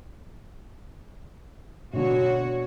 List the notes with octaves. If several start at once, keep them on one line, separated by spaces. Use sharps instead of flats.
B2 D3 F#4 C#5